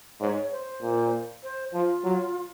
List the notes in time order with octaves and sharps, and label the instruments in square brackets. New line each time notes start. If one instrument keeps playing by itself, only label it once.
[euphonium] G#2 [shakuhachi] C#5
[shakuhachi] C5
[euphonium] A#2
[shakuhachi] C5
[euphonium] F3 [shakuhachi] F4
[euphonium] F#3